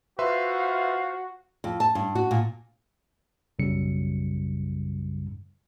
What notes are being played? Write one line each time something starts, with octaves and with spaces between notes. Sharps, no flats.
F4 F#4 B4 C5 E5 F5 C6
F2
A5
G2
F#4
A#2
B1 F#2 C#3 G3 C#7